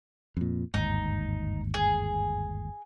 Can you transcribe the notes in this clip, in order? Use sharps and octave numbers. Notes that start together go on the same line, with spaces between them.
F2 A#2
G1 D#2 G#2 D#4
G#4